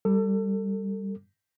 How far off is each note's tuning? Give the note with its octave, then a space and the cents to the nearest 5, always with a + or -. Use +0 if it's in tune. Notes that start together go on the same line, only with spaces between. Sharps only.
G3 +0 A4 +30